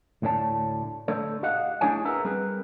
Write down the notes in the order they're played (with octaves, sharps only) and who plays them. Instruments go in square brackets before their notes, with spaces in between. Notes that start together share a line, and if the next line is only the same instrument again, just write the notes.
[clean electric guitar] D2 A2 D3 C#5 A5
D3 A3 A4 C#5
G4 D#5 F5 F#5
A3 D4 E4 G#4 C#5 G#5
G#4 A#4 B4 E5 F#5 A#5
G3 C4 G#4 A#4 B4